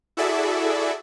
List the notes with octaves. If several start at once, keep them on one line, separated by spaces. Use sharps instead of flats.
E4 F#4 G#4 A4 D5 E5